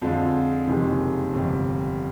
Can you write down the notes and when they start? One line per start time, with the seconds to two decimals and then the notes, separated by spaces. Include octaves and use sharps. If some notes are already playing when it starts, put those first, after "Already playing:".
0.01 F2 D3 F3 G#3
0.67 F#1 F2 C3 D#3 G#3
1.33 G1 F2 C3